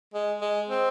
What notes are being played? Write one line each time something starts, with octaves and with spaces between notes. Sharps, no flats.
G#3
G#3
C4